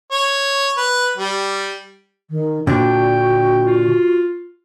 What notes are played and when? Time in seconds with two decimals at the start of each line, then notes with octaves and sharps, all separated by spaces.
0.12 C#5
0.77 B4
1.18 G3
2.30 D#3
2.67 A#2 D3 D4 F#4 G5
3.66 F4